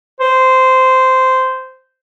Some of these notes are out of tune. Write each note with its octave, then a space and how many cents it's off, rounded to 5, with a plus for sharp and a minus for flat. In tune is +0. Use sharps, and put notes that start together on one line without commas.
C5 -10